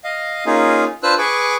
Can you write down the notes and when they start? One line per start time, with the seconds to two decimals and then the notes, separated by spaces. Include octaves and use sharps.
0.04 D#5 F5
0.46 A#3 C#4 D#4 F4 G#4
1.03 D4 F4 B4 C5 E6 F#6
1.18 G#4 B4 G#5 C#6 D6